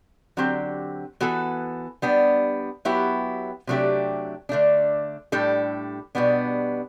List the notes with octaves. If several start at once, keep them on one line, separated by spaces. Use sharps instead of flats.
D3 F#3 C4 G4
E3 B3 F#4 A4
G3 B3 D4
F#3 B3 E4 G4
C3 F#3 A3 D4 G4
D3 A3 D4
A2 G3 D4 A4
B2 G3 B3 D4